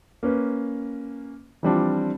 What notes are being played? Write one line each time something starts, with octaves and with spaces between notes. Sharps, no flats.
A#3 C#4 B4
E3 F3 G3 C4 D4 F4